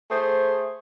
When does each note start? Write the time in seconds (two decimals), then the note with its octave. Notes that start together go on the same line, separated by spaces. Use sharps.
0.11 A3 G#4 C5